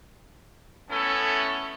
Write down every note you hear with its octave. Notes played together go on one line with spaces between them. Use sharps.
A3 B3 C#4 E4 A4